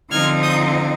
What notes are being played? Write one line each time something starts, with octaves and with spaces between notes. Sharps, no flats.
D3 F3 C4 D#4 F6 G#6
D#6 G6